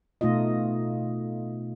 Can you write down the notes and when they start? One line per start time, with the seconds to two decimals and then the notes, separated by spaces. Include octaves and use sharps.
0.21 B2 A3 D#4 F4 D#5